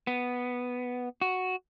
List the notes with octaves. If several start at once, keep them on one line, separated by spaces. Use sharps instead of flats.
B3
F#4